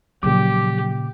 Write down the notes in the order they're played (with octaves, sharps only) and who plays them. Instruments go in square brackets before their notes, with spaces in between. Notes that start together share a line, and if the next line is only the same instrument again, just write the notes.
[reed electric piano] A#2 C#3 D6 [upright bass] F3 F#3 [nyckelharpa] G4